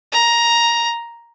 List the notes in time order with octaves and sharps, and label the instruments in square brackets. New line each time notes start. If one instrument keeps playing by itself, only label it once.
[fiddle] A#5